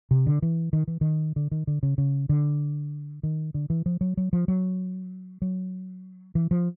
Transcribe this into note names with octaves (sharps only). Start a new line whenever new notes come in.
C3
D3
E3
D#3
E3
D#3
D3
D#3
D3
C#3
C#3
D3
D#3
D3
E3
F3
F#3
F#3
F3
F#3
F#3
E3
F3